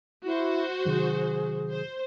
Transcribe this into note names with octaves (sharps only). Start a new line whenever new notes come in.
E4 F#4 C5
C3 D#3 F#3 G#4
C5